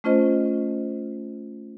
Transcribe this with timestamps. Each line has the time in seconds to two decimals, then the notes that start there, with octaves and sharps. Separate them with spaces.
0.04 A3 C#4 F4 C5 D#5